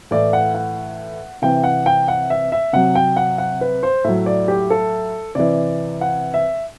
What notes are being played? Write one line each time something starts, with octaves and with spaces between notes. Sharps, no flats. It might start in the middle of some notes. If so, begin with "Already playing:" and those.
A2 E3 D5
F#5
F#5
C3 E3 G5
F#5
G5
F#5
E5
E5
C3 F#3 F#5
G5
F#5
F#5
B4
C5
A2 F#3 E5
D5
G4
A4
C3 E3 D5
F#5
E5